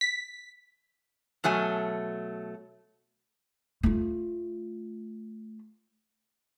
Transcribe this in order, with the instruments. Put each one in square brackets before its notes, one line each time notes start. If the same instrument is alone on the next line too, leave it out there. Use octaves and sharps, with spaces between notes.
[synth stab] B6
[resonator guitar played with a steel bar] B2 F#3 A3 G#5
[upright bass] A3 F4